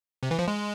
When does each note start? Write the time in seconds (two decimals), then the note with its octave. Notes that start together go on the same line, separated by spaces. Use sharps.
0.23 C3
0.31 E3
0.39 F3
0.48 G#3